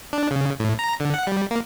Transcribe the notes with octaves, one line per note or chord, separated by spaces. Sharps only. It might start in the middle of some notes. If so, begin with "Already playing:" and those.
D4
C#3
A2
A#5
D3
F#5
G3
A#3